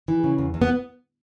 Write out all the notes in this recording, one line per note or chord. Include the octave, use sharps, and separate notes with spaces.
E3
C#3
E2
E2
B3